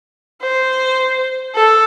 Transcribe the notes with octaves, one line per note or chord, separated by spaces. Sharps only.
C5
A4